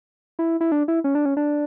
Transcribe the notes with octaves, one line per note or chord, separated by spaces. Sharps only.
E4
E4
D4
E4
C#4
D4
C#4
D4